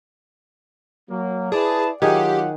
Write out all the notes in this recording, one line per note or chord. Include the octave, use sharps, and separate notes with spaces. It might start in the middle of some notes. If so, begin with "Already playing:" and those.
F#3 A#3
E4 G#4 B4 D5 A5
D#3 F#3 F4 G4 G#4 F#5